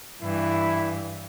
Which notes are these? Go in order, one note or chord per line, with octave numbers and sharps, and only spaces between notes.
G2 E3 E4